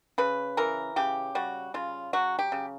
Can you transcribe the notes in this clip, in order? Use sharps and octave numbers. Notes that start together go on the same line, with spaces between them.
C#3 B4
E3 A#4
C#3 G4
G3 F#4
C#3 F4
F#3 F#4
G4
C#3